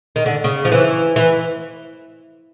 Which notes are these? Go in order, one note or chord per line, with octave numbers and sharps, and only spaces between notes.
D#3
D3
C#3
F3
E3
E3